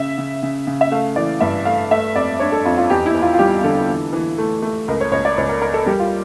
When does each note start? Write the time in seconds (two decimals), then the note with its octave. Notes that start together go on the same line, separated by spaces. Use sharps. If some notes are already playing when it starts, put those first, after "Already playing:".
Already playing: C#3 E5
0.18 C#3
0.43 C#3
0.67 C#3
0.81 E5
0.91 A3 F5
1.16 E3 D5
1.40 G2 E5
1.65 A3 F5
1.91 A3 E5
2.15 F2 D5
2.39 D4 C#5
2.52 A4
2.65 F2 F4
2.77 F4
2.90 E2 G4
3.06 E4
3.14 E2
3.22 F4
3.34 F4
3.39 G3 G4
3.64 D3 A4
3.89 E3
4.13 E3
4.38 A3
4.62 A3
4.88 C#2 A#4
5.01 C#5
5.12 C#2 C#5
5.25 D5
5.38 C#2 C#5
5.49 A#4
5.61 A#3 A#4
5.74 A4
5.86 G3 G4
6.00 F4